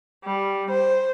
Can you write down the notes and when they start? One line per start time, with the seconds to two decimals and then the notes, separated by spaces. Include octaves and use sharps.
0.25 G3
0.71 C5